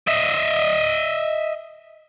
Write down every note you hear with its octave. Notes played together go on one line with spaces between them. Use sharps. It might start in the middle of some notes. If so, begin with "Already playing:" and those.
D#5 E5